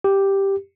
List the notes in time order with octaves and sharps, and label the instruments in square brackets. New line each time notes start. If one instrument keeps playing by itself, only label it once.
[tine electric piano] G4